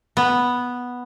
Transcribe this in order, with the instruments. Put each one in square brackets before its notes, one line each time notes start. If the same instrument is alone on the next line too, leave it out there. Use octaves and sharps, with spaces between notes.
[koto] B3